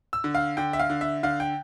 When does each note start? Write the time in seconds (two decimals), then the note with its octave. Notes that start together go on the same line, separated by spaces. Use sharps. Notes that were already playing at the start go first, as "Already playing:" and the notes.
0.13 E6
0.24 D3
0.35 F5
0.57 D3 G5
0.73 E5
0.79 F5
0.90 D3
1.01 E5
1.23 D3 F5
1.40 G5